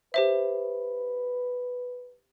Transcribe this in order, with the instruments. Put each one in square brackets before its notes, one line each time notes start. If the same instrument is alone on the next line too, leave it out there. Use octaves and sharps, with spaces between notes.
[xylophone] G4 C5 E5 [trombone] B4